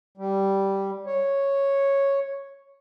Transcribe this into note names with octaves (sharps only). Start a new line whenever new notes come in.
G3
C#5